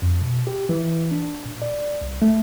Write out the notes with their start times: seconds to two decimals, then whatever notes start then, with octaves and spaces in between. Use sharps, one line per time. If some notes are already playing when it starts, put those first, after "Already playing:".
0.02 F2
0.22 B2
0.47 G4
0.69 E3
1.11 D4
1.45 A#2
1.62 D5
2.01 C2
2.22 A3